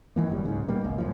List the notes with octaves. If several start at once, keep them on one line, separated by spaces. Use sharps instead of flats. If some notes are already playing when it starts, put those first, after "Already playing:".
D#3 E3 A#3
F#1 F#2 G3
D1 B1 G#2 C#3
B2 G3 A#3
G#1 C#2
F#2 A2 C3 F3